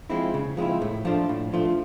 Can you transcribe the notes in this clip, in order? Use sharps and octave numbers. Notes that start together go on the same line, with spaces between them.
F3 G#3 C4 E4
C#3
F3 G#3 C4 E4
A2
F3 A3 D4 F4
A2
F3 A3 D4 F4